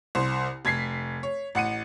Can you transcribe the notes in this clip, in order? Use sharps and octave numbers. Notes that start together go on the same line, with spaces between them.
C2 C5
F1 G#6 B6 C7
C#5
A1 F#5 C#7 D#7